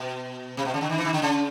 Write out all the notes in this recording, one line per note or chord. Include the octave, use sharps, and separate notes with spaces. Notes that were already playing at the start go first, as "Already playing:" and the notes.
Already playing: B2
C3
B2
C#3
D3
D#3
E3
D#3
D3
C#3